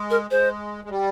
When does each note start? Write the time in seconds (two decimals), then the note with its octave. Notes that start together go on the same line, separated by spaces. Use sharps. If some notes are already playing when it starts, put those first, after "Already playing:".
Already playing: G#3
0.10 A#4
0.31 G#3 C5
0.85 G#3
0.90 G3